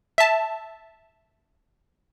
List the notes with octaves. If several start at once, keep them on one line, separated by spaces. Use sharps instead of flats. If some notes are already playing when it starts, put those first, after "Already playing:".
E5 A5